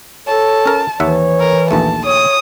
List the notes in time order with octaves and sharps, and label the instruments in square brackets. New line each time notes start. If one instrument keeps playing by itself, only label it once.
[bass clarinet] A4 [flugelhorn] C#5 [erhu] A5
[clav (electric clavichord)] C#4 A#4
[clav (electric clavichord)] D#2 E5 F#5 [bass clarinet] E3 [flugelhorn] C#5
[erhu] A#4
[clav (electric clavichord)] A#1 D#2 A3 [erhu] A5
[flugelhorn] C#5 [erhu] D#6